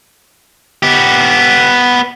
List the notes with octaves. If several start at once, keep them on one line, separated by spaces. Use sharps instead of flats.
B3 G4